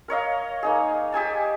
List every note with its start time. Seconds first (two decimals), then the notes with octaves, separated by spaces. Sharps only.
0.08 A#4 C#5 D#5 F5
0.63 A#3 D#4 G#4
1.12 G4 G#4 G#5 A5